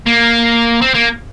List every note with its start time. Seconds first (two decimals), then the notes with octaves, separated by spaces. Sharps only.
0.06 A#3
0.81 C4
0.94 A#3